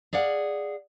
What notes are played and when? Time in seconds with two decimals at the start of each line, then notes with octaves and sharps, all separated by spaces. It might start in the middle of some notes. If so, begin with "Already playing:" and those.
0.13 G#4 D5 F5 F#5